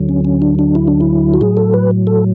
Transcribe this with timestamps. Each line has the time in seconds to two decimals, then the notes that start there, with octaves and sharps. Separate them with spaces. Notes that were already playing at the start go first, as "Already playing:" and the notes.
Already playing: D2 D3 F#3
0.09 C#4
0.25 C#4
0.42 D4
0.59 D4
0.75 E4
0.87 D4
1.01 E4
1.34 F#4
1.41 A2 F#3 G#4
1.57 A4
1.74 B4
2.07 A4